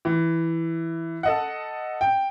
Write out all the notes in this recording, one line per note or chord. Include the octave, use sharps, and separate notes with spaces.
E3
A4 D#5 F#5
G5